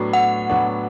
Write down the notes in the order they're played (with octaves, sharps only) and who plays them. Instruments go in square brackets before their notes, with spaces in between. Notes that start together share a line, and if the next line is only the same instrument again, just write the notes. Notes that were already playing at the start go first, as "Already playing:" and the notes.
Already playing: [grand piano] A2 F#3 B3 D4 F#4
[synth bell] F#5
[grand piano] A2 F#3 B3 D4 F#4